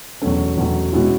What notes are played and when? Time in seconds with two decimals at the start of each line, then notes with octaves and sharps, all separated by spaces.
0.22 E2 B2 F#3 A3 C#4
0.57 E2 B2 F#3 A3 C#4
0.92 B2 G#3 C#4 E4